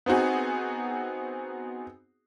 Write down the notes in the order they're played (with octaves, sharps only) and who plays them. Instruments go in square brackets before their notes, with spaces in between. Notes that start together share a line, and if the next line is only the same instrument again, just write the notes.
[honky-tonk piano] B3 C4 D#4 F#4 G#4